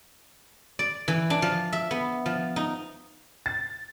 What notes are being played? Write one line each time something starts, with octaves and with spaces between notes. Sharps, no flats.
D5
E3
D4
F3
E5
B3
F3
D#4
A6